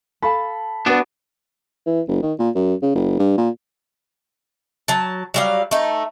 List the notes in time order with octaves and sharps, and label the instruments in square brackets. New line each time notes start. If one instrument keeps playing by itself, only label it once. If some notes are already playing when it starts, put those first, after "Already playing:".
[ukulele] A4 F5 A5 [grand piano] B5
[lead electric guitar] B3 D4 [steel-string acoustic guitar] F#4 B4
[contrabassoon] E3
F#1
D#3
A#2
F#2
C#3
F#1
G2
A#2
[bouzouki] F#3 A5
F#3 G3 F5
A3 D#4